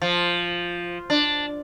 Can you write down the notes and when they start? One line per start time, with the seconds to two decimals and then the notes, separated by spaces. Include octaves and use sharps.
0.02 F3
1.10 D4